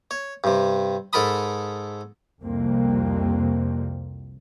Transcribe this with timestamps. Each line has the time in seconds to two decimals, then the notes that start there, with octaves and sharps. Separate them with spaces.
0.11 C#5
0.44 G2 C3
1.13 G#2 A4 A#4 A5 B5 D#6
2.42 C2 F2 C3 G3 A#3 C4